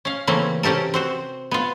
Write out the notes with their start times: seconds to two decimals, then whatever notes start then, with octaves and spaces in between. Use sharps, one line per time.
0.05 C#4 F5
0.27 C#3 E3 A3 A#3 C4 C#4
0.63 C3 C#4 G4 A4 A#4
0.94 C4 F#4 C5
1.51 B3 F4